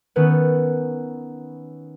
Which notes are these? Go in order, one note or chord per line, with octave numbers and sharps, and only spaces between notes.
D#3 B3 C#4 A4 B4